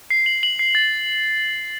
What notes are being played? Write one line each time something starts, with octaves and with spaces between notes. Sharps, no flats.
C7
F#7
F#7
C7
A6